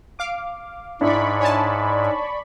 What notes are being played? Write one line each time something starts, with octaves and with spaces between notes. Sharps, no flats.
F5 D6
G#2 D4 E4 D5 B5 C#6
C#5 G#5 A5